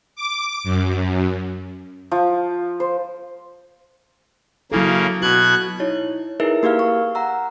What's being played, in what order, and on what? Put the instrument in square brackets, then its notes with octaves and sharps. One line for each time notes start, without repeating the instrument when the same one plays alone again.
[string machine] D6
F#2
[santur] F3
C5
[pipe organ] C#3 A#3 [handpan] F#3 E4 A4
[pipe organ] B2 F#6 G#6 [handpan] F#4
[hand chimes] D#4 E4 C#5
D#4 E4 G#4 A#4 B4 E5
A#3 G4 A#4 F5 F6
C#6
F#5 A#5 E6